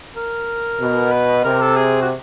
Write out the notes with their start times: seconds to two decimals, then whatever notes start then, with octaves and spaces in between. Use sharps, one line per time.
0.16 A#4
0.81 B2
1.12 B4
1.44 C3 A#4
1.61 A4
1.77 G#4
2.02 F#4